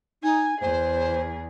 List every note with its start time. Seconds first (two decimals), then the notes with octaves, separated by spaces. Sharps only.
0.23 D#4 G#5
0.61 E2 G#4 C5